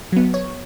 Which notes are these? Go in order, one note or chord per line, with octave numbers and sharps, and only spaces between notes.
F#3 B3
C#5